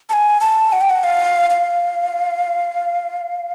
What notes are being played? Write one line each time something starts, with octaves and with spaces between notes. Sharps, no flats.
A5
G#5
A5
F#5
G5
F#5
F5
F5